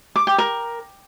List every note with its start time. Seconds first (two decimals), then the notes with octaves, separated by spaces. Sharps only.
0.16 D6
0.27 G5
0.38 A#4